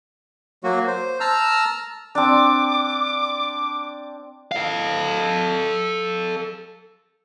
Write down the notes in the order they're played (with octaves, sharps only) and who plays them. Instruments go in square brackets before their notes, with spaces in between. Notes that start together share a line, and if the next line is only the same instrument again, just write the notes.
[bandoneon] F#3 A#3 F#4
C5
A5 A#5 E6 F6
[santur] C4 D4 [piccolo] D6
[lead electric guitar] A4 F5